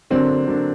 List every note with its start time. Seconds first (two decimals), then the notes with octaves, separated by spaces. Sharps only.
0.10 D3 F#3 A#3 C4 D4
0.47 D3 F#3 A#3 D4